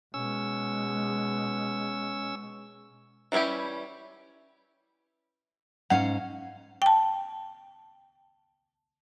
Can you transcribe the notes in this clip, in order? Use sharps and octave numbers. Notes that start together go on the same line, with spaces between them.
B2 G#3 C#4 E6
E3 G3 C#4 E4 G4
G#2 C#4 F5 F#5
G5 A5